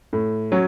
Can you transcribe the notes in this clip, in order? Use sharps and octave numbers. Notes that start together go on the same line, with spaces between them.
A2
F#3 C#4